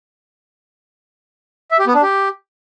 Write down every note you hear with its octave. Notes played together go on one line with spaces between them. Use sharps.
E5
G4
B3
D4
G4